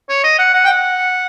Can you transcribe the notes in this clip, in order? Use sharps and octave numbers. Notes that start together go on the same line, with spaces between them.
C#5
D#5
F#5
F#5
G5
F#5